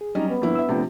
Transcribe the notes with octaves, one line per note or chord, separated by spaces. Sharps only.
G#4
F#3 G3 C#4 D#4 D#5
B3
G1 F3 A#3 E4
E5 E6
C3 F3 A3 D4 G5